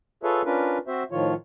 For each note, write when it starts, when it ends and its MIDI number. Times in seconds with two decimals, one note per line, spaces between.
0.23 0.42 65
0.23 0.42 68
0.23 0.42 69
0.23 0.42 71
0.23 0.42 73
0.23 0.42 76
0.45 0.78 61
0.45 0.78 62
0.45 0.78 65
0.45 0.78 70
0.45 0.78 71
0.87 1.03 60
0.87 1.03 66
0.87 1.03 72
0.87 1.03 76
1.11 1.34 45
1.11 1.34 51
1.11 1.34 53
1.11 1.34 65
1.11 1.34 73